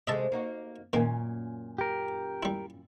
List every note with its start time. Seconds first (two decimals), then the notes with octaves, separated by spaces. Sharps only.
0.07 C3 G#3 A3 D#5 E5 A5
0.32 A#3 D#4 F#4
0.93 F#2 A#2 D#3 A#3 C#4
1.78 G4 A#4
2.43 G3 E4